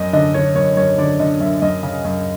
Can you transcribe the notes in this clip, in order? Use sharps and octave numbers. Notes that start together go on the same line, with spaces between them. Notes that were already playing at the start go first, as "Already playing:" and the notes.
Already playing: F#2 D#5
D3 D#5
D3 C#5
F#2 C#5
F#2 C#5
D3 D5
D3 D#5
F#2 E5
F#2 D#5
C#3
F#2